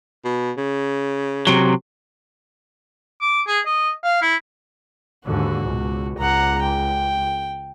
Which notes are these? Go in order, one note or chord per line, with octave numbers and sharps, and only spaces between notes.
B2
C#3
C3 F#3
D6
G#4
D#5
F5
E4
D#2 G#2 D3 F#4
C#2 B2
C#2 F#5 A#5
G5